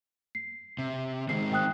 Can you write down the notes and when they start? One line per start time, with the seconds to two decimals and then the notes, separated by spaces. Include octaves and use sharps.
0.35 C7
0.78 C3
1.29 D#3 G#3 C4 C7
1.53 G5 D#6 F#6